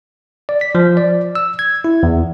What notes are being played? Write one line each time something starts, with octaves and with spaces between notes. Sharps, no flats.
D5
B6
F3
D5
E6
G#6
E4
E2